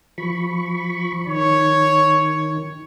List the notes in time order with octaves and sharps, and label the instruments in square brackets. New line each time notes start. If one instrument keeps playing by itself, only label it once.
[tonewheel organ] F3 B5 C#6
[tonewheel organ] D#3 [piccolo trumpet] C#5